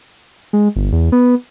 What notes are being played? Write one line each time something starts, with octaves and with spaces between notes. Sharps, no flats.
G#3
G1
E2
B3